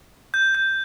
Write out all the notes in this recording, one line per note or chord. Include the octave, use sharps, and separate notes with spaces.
G6
G6